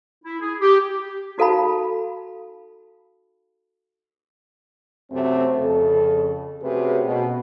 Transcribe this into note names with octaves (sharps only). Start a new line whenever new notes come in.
E4
G#4
G4
D#4 F#4 A4 F5 A5 B5
F#2 C3 A3 C4
F2 C#3 A4
C3 A3 C#4 F#4 G#4 B4
B2